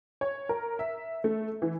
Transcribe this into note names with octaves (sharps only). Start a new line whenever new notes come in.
C#5
A#4
E5
A3
E3